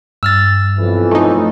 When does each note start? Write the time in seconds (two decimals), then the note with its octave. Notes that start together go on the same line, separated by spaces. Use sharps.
0.23 G2 E6 F6 A6
0.78 B1 F2 E3
1.11 A3 D#4